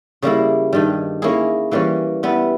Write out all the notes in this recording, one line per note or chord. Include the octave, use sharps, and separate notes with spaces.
C#3 G3 A#3 E4
G2 D#3 G3
A#3 C#4 E4 G#4
E3 G3 A#3 C#4
G3 B3 E4